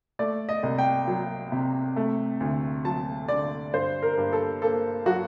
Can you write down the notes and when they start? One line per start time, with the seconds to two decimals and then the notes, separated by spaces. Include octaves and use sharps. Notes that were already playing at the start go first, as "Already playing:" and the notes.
0.19 A3 D5
0.49 D#5
0.63 C2
0.78 G5
1.08 F#3
1.52 C3
1.96 A3
2.40 D2
2.85 F#3 A5
3.28 D3 D5
3.74 G2 C5
4.03 A#4
4.18 G2
4.33 A4
4.62 A#3 A4
5.06 F#3 F#4